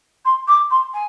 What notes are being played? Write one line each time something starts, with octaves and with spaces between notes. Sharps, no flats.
C6
D6
C6
G#5